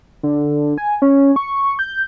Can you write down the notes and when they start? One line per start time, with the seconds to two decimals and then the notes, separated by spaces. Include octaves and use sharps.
0.23 D3
0.78 G#5
1.02 C#4
1.36 C#6
1.79 G6